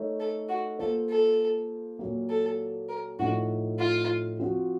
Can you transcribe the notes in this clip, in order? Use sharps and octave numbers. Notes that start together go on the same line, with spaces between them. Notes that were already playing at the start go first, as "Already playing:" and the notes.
Already playing: A3 D#4 A#4 C#5
A4
F#4
A#3 F4 A4 C5
A4
A#2 F#3 A#3
A4
A#4
A2 F3 A3 D#4 F#4
F4
F3 C4 F#4